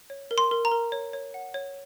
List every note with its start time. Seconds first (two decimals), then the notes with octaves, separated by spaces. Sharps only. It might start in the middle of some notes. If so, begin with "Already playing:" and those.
0.10 C#5
0.31 A#4
0.38 C6
0.51 A#4
0.65 A#5
0.72 A#4
0.92 C#5
1.13 C#5
1.34 F#5
1.54 C#5